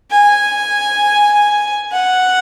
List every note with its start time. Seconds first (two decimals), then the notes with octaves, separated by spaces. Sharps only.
0.11 G#5
1.92 F#5